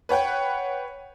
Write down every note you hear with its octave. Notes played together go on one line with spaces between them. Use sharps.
B4 C#5 F#5 G5